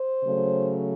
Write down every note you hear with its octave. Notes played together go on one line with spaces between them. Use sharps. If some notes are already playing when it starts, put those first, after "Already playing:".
Already playing: C5
C#3 F#3 A3